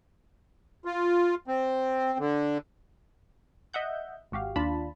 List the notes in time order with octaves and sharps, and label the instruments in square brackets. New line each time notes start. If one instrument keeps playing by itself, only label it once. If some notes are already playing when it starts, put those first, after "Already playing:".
[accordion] F4
C4
D3
[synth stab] D#5 E5 F#5 G6
G#1 F#4 G4 F5
D#2 D4 F4 A5 B5